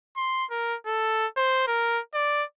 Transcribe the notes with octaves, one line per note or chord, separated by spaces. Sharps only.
C6
A#4
A4
C5
A#4
D5